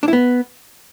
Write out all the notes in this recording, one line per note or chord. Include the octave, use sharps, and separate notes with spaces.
D4
E4
B3